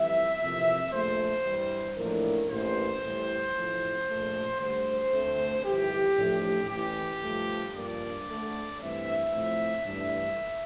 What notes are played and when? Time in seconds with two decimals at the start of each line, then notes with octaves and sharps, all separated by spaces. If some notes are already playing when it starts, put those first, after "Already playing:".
Already playing: F2 E3 G3 E5
0.39 F2 C3 E3 A#3
0.92 A#1 A#2 F3 A3 C5
1.45 G2 E3 G3
1.97 A1 A2 F3 A#3 D4 A#4
2.50 A1 G2 E3 G3 A#3 C5
3.02 A2 E3 G3
3.55 A1 A2 F3
4.07 A#1 A#2 A3
4.60 D2 D3 G3 C5
5.12 D2 D3 A3 C4
5.65 G1 F2 E3 G4
6.17 A1 A2 F3 A3 D4
6.70 A1 A2 E3 G4
7.22 G2 F3 A3
7.75 G2 F3 A#3 D4 D5
8.28 D2 D3 A3
8.80 G2 E3 A3 C4 E5
9.33 A2 F3 C4
9.85 G2 E3 A3 D4